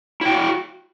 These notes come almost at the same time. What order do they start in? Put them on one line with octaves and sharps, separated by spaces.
E4 G5 F#4